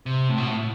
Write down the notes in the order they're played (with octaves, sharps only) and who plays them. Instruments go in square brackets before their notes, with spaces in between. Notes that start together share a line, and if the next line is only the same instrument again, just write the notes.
[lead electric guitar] C3
A2
B2
A2